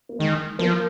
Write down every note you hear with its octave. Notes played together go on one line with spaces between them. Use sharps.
A#3
D#3 G#3
F3 A#3